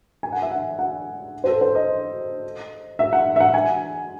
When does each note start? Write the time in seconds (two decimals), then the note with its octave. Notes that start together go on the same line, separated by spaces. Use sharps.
0.23 G#5
0.32 F#5
0.42 E5
0.51 F#5
0.79 F#5
1.44 C5
1.47 A4
1.61 C5
1.75 D#5
2.99 E5
3.13 F#5
3.36 E5
3.40 F#5
3.54 G#5